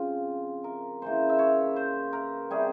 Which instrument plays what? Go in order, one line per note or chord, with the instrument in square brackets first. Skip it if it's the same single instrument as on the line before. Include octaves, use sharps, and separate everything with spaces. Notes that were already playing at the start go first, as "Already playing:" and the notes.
Already playing: [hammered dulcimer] C#3 F3 C4 F4
A#4
C#3 E3 A#3 C5
E5
C#5
C5
A#4
C3 G3 C#4 G#4